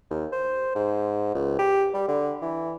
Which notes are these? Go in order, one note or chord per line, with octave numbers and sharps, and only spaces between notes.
D#2
C5
G#2
C#2
G4
G3
D3
E3